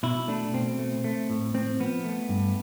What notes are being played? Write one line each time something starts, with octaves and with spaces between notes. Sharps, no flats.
B2 E4
A3 D4
B2 C4
A3
A3
A2
A2 C4
F3 B3
A3
G2